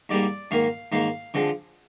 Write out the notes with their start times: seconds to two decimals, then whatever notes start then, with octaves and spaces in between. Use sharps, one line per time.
0.09 G#2 G3 A#3 D5
0.51 G#2 D#3 A#3 F5
0.92 G#2 D#3 A#3 F5
1.34 D3 F3 G#3 C4